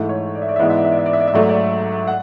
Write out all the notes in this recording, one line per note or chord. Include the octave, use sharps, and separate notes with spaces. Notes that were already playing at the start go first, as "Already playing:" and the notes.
Already playing: G#2 E3 A3
C#5
D5
E5
D5
E5
G#2 E3 G#3 B3 D5
E5
D5
E5
D5
E5
D5
E5
D5
E5
G#2 F#3 A3 D5
E5
D5
F#5